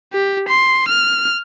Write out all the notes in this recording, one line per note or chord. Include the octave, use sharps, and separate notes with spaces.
G4
C6
F6